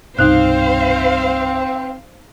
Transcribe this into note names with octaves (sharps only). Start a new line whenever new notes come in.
C2 G2 B2 C4 D#4 C5 F5 F#6